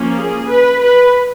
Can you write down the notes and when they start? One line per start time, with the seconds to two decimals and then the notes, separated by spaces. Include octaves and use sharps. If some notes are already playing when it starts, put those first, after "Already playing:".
Already playing: F3 A#3 C#4
0.17 G#4
0.48 B4
0.81 B4